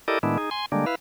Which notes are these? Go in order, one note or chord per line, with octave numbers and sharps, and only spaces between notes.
E4 G4 A4 A#4 D5 D#5
A2 D#3 G#3 B3 D4 E4
D#4 G#4
G#5 C6
D3 G3 G#3 A#3 D4
E4 B4 F5